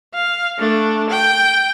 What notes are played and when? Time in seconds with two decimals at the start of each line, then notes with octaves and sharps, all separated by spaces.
0.14 F5
0.58 A3 D4
1.10 G5